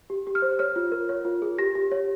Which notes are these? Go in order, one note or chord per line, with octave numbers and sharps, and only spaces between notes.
G4
G4
F6
C5
C#5 F6
F4
A#4
C#5
F4
G#4
G4 A#6
G4
C#5